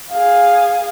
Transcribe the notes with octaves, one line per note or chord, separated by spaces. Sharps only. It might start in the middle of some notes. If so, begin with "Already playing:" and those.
G#4 F5